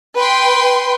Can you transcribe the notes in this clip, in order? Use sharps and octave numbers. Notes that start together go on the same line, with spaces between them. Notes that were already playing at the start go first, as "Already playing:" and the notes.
B4 G5 C6